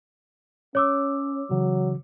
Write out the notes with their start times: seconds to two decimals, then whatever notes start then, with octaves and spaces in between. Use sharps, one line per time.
0.75 C#4 C#5 D6 E6
1.50 C#3 E3 F#3